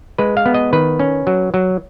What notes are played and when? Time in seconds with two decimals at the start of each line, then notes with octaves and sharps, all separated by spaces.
0.18 G#3 B4
0.37 F5
0.46 B3
0.54 D#5
0.73 D#3 B4
0.99 C#4
1.27 F#3
1.54 F#3